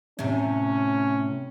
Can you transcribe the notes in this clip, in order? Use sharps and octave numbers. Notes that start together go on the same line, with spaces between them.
A2 C3 C#4